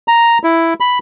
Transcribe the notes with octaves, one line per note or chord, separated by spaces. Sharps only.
A#5
E4
B5